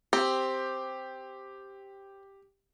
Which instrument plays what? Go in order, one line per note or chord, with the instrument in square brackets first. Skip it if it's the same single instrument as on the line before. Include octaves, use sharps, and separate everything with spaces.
[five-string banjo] C4 [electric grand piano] G4